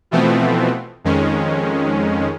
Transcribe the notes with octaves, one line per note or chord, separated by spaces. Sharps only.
B2 E3 F3 A3 B3 C4
F2 D#3 G#3 C#4